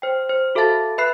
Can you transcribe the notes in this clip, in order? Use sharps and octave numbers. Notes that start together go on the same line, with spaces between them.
C5 G5
C5
F#4 A4 E5 F5 A5 A6
B4 E5 B5 F#6 C7